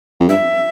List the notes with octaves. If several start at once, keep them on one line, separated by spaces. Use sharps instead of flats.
F2
G2 E5